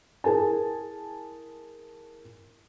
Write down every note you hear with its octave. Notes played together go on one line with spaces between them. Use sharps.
E4 G#4 A#4 G#5 A5